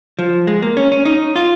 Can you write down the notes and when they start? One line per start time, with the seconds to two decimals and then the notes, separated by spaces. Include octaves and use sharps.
0.19 F3
0.47 G#3
0.62 A#3
0.77 C#4
0.92 C#4
1.05 D#4
1.36 F4